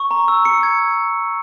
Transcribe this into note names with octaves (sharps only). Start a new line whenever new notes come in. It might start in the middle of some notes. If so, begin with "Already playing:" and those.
Already playing: C#6
A#5
E6
C#7
G#6